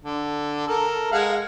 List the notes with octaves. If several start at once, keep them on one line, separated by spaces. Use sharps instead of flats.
D3
A4 A#4
G#3 F5 F#5